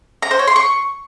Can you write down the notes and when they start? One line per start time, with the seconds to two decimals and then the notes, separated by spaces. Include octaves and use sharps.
0.22 A#5
0.31 C5
0.39 C#5
0.47 C6
0.56 C#6